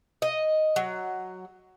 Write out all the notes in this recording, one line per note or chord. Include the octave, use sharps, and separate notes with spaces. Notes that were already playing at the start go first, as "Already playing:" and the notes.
D#5
F#3